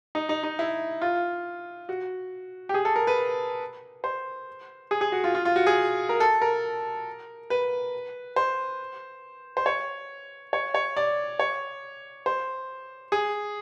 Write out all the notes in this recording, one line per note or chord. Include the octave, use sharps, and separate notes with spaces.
D#4
D#4
D#4
E4
F4
F#4
G4
G#4
A4
A#4
B4
C5
G#4
G#4
F#4
F4
F4
F4
F#4
G#4
A#4
A4
A#4
B4
C5
C5
C#5
C#5
C#5
D5
C#5
C5
G#4